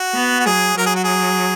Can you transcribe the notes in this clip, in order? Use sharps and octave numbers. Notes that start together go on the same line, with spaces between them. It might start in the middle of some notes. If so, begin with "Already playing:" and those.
Already playing: F#4
B3
F#4
F#3 G#4
F#3 A#4
G#4
F#4
G#4